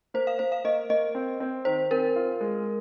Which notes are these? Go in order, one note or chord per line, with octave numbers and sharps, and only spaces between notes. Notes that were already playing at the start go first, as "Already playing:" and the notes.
A#3 C5
F5
A#3 C5
F5
A#3 D#5
A#3 D#5
C4
C4
D#3 C5
C4 A#4
F4
G#3